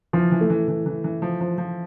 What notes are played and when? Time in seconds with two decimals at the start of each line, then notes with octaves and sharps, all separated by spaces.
0.13 E3 F3
0.32 E3
0.41 A3
0.50 E3
0.68 E3
0.86 E3
1.04 E3
1.22 F3
1.41 F3
1.58 F3